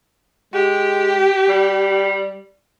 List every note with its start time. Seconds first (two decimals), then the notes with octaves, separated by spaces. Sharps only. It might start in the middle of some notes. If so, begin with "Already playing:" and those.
0.54 G#3 G4
1.49 G3